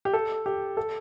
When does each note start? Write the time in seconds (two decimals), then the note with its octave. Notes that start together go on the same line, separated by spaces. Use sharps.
0.05 G4
0.13 A4
0.46 G4
0.77 A4